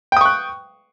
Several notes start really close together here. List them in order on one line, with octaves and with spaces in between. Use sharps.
G5 D#6 C#6 F#6